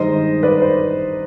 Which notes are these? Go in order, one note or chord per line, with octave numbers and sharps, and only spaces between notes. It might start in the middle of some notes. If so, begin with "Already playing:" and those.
Already playing: G2 D#3 G#3 C5 D#5
B4 D5
C5